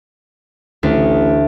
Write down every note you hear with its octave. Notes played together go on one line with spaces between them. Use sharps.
A1 D2